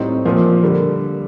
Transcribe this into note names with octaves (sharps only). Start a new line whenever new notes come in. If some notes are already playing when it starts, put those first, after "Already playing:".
Already playing: A2 G3 C4 D#4
A#2 F3 A#3
D3 G3 A#3